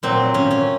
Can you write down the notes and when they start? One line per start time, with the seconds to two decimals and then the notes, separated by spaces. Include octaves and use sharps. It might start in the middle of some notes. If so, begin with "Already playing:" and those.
0.03 A#2 F#3 C4
0.34 C#4
0.51 C#4